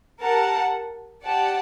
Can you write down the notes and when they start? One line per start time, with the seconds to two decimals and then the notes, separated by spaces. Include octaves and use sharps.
0.22 G4 A#4 F#5 A5
1.23 G4 D5 F#5 A5